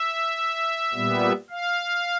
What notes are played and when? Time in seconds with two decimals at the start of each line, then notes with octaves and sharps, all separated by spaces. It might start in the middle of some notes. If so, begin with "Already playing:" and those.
Already playing: E5
0.94 A#2 G3 B3
1.50 F5